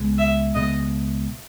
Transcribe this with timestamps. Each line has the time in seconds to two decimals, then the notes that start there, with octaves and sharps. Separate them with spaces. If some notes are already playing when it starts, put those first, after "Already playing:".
Already playing: C#2 B2 G#3
0.19 E5
0.55 C#2 B2 G#3 D#5